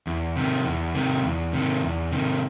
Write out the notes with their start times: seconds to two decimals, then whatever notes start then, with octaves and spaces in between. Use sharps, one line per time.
0.07 E2
0.36 C3 D#3
0.65 E2
0.95 C3 D#3
1.24 E2
1.53 C3 D#3
1.83 E2
2.12 C3 D#3